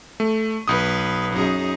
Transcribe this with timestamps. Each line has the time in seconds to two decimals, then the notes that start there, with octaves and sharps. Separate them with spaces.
0.20 A3
0.68 B1 B4 D#6
1.32 F#2 D#4 G#4